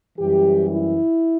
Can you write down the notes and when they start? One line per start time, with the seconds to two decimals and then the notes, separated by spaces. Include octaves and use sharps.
0.19 F#2 E3 G3 G4
0.70 E4